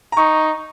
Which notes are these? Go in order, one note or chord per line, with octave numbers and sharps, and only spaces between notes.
A#5
D#4 C#6